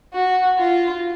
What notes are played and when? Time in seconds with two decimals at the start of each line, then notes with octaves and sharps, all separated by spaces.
0.14 F#4
0.59 F4